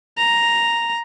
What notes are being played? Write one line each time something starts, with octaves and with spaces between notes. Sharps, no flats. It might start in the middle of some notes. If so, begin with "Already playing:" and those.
A#5